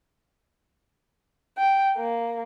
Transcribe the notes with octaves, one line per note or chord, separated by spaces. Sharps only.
G5
A#3